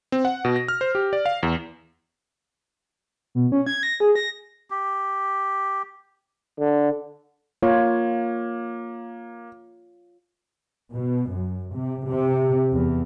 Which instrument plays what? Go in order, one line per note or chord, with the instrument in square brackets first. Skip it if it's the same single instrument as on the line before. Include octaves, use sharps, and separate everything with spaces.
[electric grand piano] C4
F#5
B2
A#6
F6
C5
G4
D5
F5
E2
[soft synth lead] B2
C#4
G#6
A#6
G#4
A#6
[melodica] G4
[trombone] D3
[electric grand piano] A#3 [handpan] F4 C#5
[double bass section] B2
F#2
C3
C3
E2